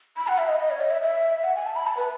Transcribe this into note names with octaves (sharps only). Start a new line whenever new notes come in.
B5
F#5
E5
D#5
D#5
C#5
D#5
E5
E5
F#5
G#5
A5
B5
A5
B4